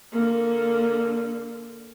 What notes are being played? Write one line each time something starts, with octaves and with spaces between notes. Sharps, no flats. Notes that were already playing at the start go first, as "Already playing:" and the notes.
D3 A#3